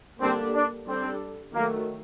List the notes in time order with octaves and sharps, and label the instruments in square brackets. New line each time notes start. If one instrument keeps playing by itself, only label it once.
[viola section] D3 G3 A#3 D4 G4 [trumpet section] C4
[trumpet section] D4
[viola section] G3 D4 A4 [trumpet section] C4
[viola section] D#3 F#3 A3 [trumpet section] A#3